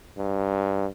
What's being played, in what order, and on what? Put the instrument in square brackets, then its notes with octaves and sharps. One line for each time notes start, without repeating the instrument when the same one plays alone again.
[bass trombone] G2